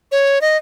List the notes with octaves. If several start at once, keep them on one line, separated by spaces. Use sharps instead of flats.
C#5
D#5